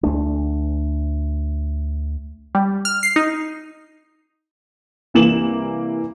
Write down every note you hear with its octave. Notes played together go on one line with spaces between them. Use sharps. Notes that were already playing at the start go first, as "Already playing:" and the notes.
D2 A3 D4
G3
F6
C7
D#4
C2 E3 A#3 E7 F#7